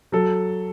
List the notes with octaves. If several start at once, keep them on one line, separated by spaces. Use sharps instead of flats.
F#3 A4